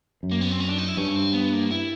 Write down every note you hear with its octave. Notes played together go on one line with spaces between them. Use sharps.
F#2
A#3
B3
C4
C#4
D4
D#4
E4
G2 C#4
C4
B3
A#3
E4